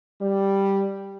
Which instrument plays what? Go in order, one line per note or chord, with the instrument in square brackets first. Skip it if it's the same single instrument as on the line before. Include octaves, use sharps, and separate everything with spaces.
[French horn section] G3